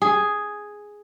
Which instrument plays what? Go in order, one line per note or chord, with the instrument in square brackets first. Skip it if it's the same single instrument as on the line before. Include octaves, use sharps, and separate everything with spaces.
[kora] G#4